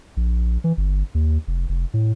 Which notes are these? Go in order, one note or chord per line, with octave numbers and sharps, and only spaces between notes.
A#1
E3
G1
D#2
F1
F1
A2